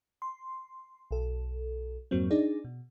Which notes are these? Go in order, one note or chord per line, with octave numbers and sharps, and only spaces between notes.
C6
B1 A4
F2 G#2 F#3 A#3 C4
D4 D#4 G#4 D5
B2